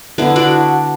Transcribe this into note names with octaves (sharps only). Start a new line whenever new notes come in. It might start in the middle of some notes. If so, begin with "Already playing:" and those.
D3 B3 E4
D4 F#4